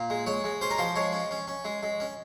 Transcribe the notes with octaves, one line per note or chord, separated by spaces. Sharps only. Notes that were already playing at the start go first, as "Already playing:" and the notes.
Already playing: A#2
G#3
G#3 C#5
G#3
C#4 C5
A#4
F3 C5
G#3 C#5
C#4
C#4
C#4
G#3
G#3
C#4